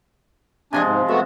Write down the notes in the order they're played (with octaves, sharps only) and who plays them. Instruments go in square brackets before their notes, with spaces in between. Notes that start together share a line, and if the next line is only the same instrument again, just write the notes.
[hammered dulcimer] C3 F3 G#3 [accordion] D4 G#5
[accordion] G#2
[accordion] A3 B3 F#4 [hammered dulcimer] E5